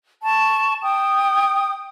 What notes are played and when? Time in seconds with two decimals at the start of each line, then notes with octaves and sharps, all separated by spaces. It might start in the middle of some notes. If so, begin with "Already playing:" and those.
0.23 A5 C#6
0.81 G5 D#6